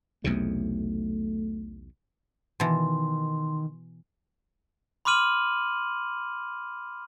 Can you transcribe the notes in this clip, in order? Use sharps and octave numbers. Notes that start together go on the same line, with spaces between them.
B1 E2 C3 A3
B2 D#3 E3 C6
B5 C6 D6 F6 D#7 F#7